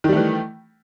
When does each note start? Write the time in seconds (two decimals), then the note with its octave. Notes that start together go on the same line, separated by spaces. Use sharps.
0.04 D#3
0.08 G3
0.12 A3
0.17 E3